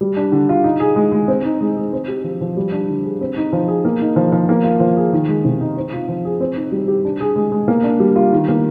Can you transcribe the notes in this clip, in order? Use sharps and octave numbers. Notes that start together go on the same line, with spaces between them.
G3
D4
D3
F4
D#4
G#4
G#3
G#3
C4
D#4
G#3
G#4
C4
G4
F3
F3
G3
D4
D3
G#4
C4
D#4
F3
G#4
A#3
D#4
F3
F3
A#3
F4
F3
G#4
D#3
G#3
C3
D#4
C4
F4
F3
G#4
C4
D#4
G3
G4
D4
G#4
G#3
G#3
A#3
D4
G3
F4
D#3
A#3